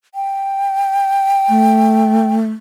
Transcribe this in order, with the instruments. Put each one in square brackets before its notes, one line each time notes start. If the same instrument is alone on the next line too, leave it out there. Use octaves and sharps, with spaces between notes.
[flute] G5
[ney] A3